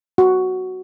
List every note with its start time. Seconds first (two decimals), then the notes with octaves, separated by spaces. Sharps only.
0.18 F#4